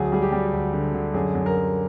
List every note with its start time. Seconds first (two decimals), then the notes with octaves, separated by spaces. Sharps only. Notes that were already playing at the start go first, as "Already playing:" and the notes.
Already playing: D2 F#3 G#4
0.12 G3 G#4
0.22 G4
0.32 G3
0.53 D2
0.74 D3
0.94 D3
1.14 F#2 G#4
1.35 F#2
1.46 A#4
1.56 F#2